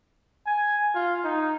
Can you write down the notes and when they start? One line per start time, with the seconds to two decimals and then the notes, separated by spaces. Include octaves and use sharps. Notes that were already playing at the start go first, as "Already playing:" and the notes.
0.47 G#5
0.95 F4
1.24 D#4